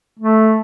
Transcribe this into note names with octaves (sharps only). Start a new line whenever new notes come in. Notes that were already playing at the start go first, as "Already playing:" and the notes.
A3